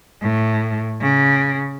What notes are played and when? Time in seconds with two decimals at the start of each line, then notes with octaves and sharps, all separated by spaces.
0.21 A2
1.01 C#3